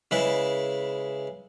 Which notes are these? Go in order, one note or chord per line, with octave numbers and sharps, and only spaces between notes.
C#3 G#3 E4 B4